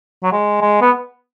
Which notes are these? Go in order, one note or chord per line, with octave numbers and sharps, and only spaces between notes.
F#3
G#3
G#3
B3